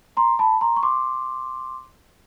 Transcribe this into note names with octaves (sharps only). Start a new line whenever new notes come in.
A#5 C6
A5 B5
A#5 C6
C#6
C6 D6